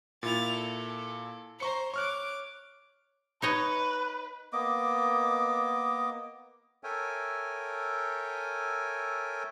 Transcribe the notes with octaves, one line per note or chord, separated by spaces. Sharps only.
A#2 E4 A6 F7
A4
C5 A#5 C#6 C#7
C#5 C#6 D6 F6 F#6
D#4 B4 C#5 D#5
A#3 B3 D#5 D6
A4 A#4 C#5 E5 G5 G#5